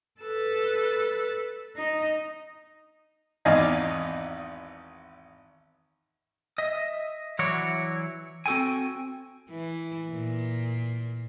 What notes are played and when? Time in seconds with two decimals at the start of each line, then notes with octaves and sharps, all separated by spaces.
0.21 A4 B4
1.76 D#4 D#5
3.45 G#1 E2 D5 D#5 F5 G#5
6.58 D#5 E5
7.39 E3 F#3 E4 F#4 C#5 D5
8.46 C4 F#4 A4 G5 G#5
9.50 E3
10.12 A#2